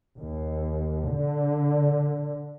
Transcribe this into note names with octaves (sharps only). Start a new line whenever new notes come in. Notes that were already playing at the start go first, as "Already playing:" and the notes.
D#2
D3